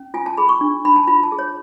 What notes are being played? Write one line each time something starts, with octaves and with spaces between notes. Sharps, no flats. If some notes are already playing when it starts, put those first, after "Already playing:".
Already playing: C#4
F4 G#5
A5
G#4 B5
C#6
D4
D4 B5
A5
F4 B5
A5
G#4
C#5